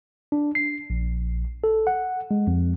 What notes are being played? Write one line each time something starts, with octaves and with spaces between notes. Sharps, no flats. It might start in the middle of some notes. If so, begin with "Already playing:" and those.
D4
C7
A#1
A4
F#5
G#3
F2